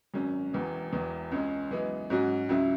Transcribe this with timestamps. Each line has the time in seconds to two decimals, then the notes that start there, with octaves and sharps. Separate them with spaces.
0.14 G#1 F#2 F#3 C#4
0.53 E1 E2 E3
0.92 E1 E2 E3
1.31 C#2 C#3 G#3 C#4
1.71 F#2 E3 G#3 B3
2.10 G#2 F#3 C#4 F#4
2.49 C#2 C#3 F#3 E4